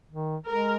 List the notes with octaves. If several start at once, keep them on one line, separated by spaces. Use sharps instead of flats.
D#3
G#3 A#4